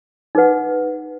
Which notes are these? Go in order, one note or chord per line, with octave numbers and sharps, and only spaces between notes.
D#4 G#4 B4 F#5